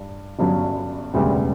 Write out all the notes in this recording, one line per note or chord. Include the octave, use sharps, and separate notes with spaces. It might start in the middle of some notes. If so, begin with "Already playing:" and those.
Already playing: G2
G1 G2 F#3 C#4
E1 D2 C#3 G3 B3